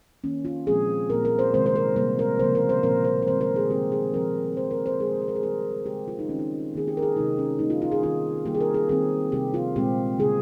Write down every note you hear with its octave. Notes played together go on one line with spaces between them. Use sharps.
D#3 A#3 C#4
F4
A#2 F3 G#3 C4 G#4
A#2 G3 A#3 A#4
A#4
C5
C3 D#3 G#3 C4 C5
C5
A#4
C3 G3 A#3 C5
A#4
C#3 F3 A#3 C5
A#4
C5
A#2 F3 C4 A#4
C5
A#4
D#3 G#3 C4 C5
A#4
G#4
D#3 G#3 C4 G4
G#4
A#2 F3 C4 A#4
A#2 F3 G#3 C5
A#4
C5
A#2 F3 G#3 G#4
G#4
A#4
G#4
D#3 G3 C4 A#4
C#3 G#3 C4 G4
F4
D#4
D#3 G3 C4 C#4
D#4
D#3 A#3 G#4
G4
A#4
G#4
C3 D#3 G#3 C4 D#4
C#4
A#2 G3 A#3 D#4
F4
F4
G#4
D#3 G3 C4 F4
D#3 G3 A#3 G4
G#4
A#4
G#4
D#3 G3 C4 G#4
C3 G3 C4 G4
F4
A#2 G#3 C4 G4
C#3 G3 C4 G#4